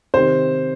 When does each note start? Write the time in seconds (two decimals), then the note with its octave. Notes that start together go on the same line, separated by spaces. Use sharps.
0.14 C3 D#3 C5